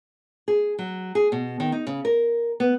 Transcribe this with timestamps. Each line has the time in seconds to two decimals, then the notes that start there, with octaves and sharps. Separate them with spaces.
0.48 G#4
0.79 F#3
1.15 G#4
1.32 B2
1.60 D#3
1.72 D#4
1.87 C#3
2.05 A#4
2.60 B3